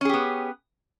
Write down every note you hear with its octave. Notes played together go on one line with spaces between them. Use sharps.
B3 C#4 G4 G#4